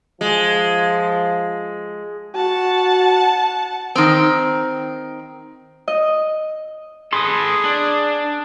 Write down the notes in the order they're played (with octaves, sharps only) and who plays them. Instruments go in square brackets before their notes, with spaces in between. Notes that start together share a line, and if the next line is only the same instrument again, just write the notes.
[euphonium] F3 [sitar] G#3
[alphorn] F#4 [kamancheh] F#5 A5
[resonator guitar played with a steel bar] D#3 C4
[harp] D#5
[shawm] G#4 [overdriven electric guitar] A4 B4 [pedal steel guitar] C6 D#6
[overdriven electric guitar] D4